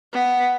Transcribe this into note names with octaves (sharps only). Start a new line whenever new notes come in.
B3